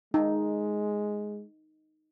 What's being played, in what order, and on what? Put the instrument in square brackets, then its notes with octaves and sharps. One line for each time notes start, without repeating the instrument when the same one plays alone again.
[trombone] G#3 [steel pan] D#4